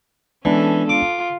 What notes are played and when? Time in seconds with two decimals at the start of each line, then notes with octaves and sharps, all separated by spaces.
0.45 E3 G#3 B3 C#4 D4 A4
0.89 F4 D6